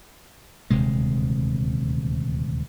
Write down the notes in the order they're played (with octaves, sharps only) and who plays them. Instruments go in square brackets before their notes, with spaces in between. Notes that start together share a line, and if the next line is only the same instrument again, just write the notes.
[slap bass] D#1 D2 C3 G#3